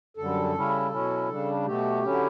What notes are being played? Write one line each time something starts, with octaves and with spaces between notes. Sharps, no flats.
F#2 D3 G3 A4
C#3 G3 C#4 E4
B2 F#3 C#4 E4
C#3 G3 D4
B2 F#3 A3 G4
D3 F#3 C#4 E4